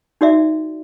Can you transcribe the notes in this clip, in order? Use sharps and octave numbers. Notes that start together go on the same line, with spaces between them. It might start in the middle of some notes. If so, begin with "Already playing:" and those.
D#4 F#4 D5 E5